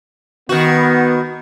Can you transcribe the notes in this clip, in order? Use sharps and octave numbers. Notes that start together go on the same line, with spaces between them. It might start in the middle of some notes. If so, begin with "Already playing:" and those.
D#3 B3 F#4